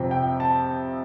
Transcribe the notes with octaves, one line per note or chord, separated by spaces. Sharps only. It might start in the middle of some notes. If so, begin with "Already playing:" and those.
Already playing: F2 C3 F3 C4 G5
G5
A5